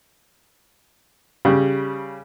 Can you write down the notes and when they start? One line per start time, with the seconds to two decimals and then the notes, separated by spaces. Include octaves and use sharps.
1.45 C#3 G3